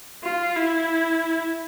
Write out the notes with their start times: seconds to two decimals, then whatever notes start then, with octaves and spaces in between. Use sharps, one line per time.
0.24 F4
0.56 E4